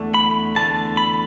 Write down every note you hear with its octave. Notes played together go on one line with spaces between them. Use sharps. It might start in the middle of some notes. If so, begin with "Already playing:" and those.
Already playing: E2 D3 A3
B5
E2 D3 A3 A5
B5